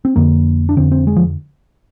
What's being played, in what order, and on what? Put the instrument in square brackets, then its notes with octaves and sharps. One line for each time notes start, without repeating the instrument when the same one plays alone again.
[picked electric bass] C4
F2 D3 A#3
D4
F2 D3 C4
C4
G#3
F3